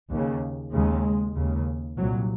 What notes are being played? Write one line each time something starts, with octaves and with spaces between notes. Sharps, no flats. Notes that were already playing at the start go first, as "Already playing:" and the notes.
D#2 C#3
D#2 C#3 G#3
D#2 C#3
C2 A#2 F#3